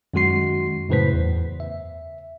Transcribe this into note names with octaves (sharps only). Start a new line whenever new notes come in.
F#2 D#3 G#3 F#4 C6 C7
F#2 A2 C#3 B4 C5 B6
E2
E5